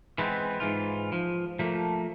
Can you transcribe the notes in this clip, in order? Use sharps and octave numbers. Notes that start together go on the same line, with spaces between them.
E3 G#3 B3 C4
G#2 E3 F4
F3
F3 A3 A#3